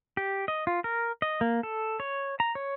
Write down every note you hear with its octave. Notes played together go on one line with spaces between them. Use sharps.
G4
D#5
F4
A#4
D#5
A#3
A4
C#5
A#5
C#5